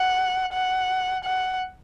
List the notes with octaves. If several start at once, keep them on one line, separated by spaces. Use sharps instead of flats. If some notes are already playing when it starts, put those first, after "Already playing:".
Already playing: F#5
F#5
F#5